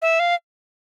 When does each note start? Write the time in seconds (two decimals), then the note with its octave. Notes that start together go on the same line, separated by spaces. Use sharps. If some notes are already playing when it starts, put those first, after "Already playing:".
0.02 E5
0.20 F5